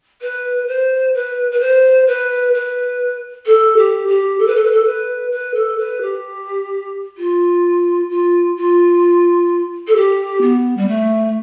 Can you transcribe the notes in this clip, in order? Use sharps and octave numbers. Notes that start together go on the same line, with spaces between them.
B4
C5
B4
B4
C5
B4
B4
A4
G4
G4
A4
B4
A4
B4
A4
B4
B4
A4
B4
G4
F4
F4
F4
A4
G4
B3
G3
A3